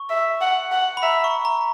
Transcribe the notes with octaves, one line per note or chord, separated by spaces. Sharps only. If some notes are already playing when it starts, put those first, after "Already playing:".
Already playing: C#6
E5
F#5
F#5
B5
E5 A#5
C#6
A#5